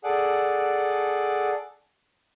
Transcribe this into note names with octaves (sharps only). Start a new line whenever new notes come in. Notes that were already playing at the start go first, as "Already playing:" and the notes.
G#4 A4 D5 F#5